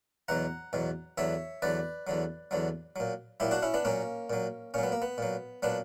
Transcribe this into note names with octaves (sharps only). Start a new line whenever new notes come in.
E2 B2 F#3 F#5 A#5
E2 B2 F#3
E2 D3 F#3 C#5 E5
E2 D3 F#3 B4 D5
E2 D3 F#3
E2 D3 F#3
A#2 F#3
A#2 F#3 E4 G4
D4 F#4
C#4 E4
B3 D4
A#2 F#3 A#3 C#4
A#2 F#3
A#2 F#3 C#4
B3
A#3
B3
A#2 F#3
A#2 F#3 B3 D4